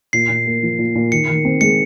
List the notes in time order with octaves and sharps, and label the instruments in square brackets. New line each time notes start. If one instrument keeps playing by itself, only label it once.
[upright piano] A#2 [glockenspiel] C7
[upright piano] A#2
A#3
F3
A#2
A#2
[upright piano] D#3 [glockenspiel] C#7
[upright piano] D#3
C4
[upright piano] G#3 [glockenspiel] C#7